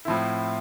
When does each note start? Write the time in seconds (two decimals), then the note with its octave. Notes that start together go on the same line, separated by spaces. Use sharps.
0.05 A2 F3 C4 E4